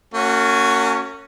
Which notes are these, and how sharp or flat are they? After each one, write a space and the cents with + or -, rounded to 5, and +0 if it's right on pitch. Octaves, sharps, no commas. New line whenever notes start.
A#3 -45 C#4 +0 F#4 +0